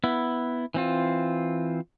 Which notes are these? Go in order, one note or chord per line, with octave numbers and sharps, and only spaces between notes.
B3 E4
E3 C4 F4